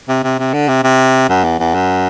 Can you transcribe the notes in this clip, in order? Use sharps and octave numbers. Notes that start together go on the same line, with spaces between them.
C3
C3
C3
D3
C3
C3
F#2
E2
E2
F#2